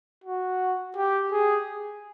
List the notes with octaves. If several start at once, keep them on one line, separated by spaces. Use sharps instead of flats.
F#4
G4
G#4